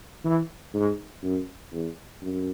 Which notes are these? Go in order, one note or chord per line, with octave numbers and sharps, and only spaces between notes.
E3
G#2
F#2
E2
F#2